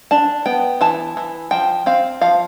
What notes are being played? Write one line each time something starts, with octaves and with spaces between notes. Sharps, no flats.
D4 A5
B3 G5
E3 A5
E3
F3 G5
C4 F5
F3 F5